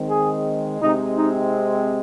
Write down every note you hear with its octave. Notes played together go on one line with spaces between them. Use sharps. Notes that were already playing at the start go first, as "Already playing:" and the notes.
Already playing: D#3 G#3 C4
G#4
C3 G#3 C4 D#4
D#4